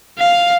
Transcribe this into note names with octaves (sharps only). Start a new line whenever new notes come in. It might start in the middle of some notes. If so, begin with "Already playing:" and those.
F5